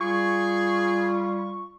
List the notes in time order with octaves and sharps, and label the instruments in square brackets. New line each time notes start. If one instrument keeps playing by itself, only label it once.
[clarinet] G3 [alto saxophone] F4 [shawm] G#4 [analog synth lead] C#6